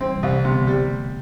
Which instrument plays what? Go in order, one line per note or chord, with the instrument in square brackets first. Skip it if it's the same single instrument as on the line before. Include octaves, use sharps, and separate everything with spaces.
[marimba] E3 G3 [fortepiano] C4
[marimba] C3 E3
[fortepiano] C2 [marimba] B2
[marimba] B2 D3
[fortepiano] C3 [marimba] G3 B3
[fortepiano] G3 [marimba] A3 C4